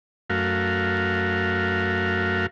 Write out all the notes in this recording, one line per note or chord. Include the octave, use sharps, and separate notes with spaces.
F#2 A3 F#4 A#4 F5